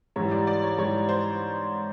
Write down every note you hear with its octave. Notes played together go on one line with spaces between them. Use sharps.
G#2 E3 G3 C#5
D5
D5
C#5
G#2 E3 G3 C#5
C5